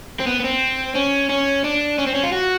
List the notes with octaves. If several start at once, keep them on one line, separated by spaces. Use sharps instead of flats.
C4
B3
B3
C4
C#4
C#4
D4
C#4
C4
C#4
F4
F#4